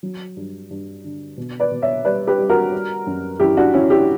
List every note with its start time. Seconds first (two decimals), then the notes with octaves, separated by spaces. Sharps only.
0.03 F#3
0.37 G2
0.70 G2
1.04 D3
1.37 B2
1.60 B4 D5
1.71 B2
1.82 C#5 E5
2.05 G3 B4 D5
2.27 G4 B4
2.39 G3
2.49 F#4 A#4
2.72 G3
3.07 F#2
3.40 F#2 E4 G4
3.57 D4 F#4
3.73 D3 C#4 E4
3.90 E4 G4